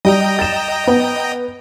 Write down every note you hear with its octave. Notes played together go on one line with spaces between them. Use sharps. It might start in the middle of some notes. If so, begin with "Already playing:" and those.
G3 G4 D#5 G5 A#5
A6 E7
B3